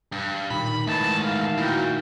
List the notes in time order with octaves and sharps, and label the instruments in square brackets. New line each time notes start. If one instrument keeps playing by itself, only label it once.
[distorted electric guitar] G2
[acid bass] A#2 [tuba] D#3 [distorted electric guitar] B5
[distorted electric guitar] G#2 E3 [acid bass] A3 [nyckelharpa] A5
[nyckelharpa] F5
[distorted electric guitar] A#2 [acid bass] E4 [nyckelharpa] F#4 G5